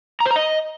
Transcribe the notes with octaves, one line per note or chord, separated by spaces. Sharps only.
A#5
C5
A#5
D#5